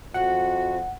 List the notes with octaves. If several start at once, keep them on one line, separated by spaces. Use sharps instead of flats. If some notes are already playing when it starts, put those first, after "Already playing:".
F2 F#4 F#5